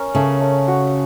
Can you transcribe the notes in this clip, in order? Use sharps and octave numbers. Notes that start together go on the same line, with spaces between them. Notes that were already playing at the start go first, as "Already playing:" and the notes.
Already playing: C#4 A#4
C#3 A3
A3
F#4